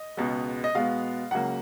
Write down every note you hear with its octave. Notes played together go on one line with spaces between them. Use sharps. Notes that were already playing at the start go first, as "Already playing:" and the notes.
Already playing: D#5
C#2 B2 G#3 B3
D#5
B2 G#3 B3 F5
C#2 C#3 F#3 A#3 F#5